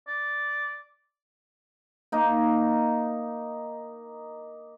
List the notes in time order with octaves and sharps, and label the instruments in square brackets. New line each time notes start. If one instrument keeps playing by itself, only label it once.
[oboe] D5
[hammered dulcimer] A#3 D#4